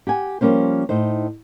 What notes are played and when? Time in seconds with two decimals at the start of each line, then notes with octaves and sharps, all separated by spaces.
0.07 G4 F#5 G#5
0.41 F3 G3 A#3 C#4 C5
0.89 A2 D#4 C5